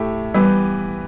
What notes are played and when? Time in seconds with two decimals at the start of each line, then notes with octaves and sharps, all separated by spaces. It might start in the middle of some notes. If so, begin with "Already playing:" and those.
Already playing: A2 A3 E4 G4
0.34 E3 G3 B3 G4 B4